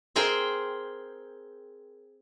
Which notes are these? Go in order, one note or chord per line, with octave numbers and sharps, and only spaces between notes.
C4 G#4 A#4 C5 G5